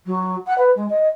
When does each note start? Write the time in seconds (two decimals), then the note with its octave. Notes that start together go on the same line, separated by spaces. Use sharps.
0.06 F#3
0.46 F#5
0.58 B4
0.75 G#3
0.89 D#5